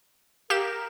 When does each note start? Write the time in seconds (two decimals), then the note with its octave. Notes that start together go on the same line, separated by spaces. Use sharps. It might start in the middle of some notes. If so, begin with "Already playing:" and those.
0.50 G4 A#4 F5 E7